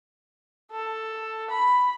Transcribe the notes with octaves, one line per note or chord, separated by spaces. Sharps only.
A4
B5